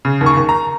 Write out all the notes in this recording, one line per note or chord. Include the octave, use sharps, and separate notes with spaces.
C#3
D#2
C#6
D#2
A#5